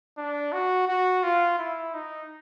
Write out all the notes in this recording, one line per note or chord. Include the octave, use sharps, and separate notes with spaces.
D4
F#4
F#4
F4
E4
D#4